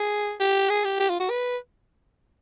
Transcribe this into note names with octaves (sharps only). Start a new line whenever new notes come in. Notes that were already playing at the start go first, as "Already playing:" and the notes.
Already playing: G#4
G4
G#4
G4
G4
F4
F#4
B4